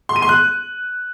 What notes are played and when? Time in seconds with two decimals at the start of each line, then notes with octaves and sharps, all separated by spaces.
0.09 C6
0.16 D#7
0.22 C6
0.29 F#6